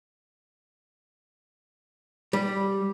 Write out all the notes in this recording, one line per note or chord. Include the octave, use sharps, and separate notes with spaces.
G3